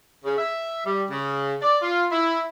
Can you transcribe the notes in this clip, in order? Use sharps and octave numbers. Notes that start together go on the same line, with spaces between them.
C#3
E5
G3
C#3
D5
F4
E4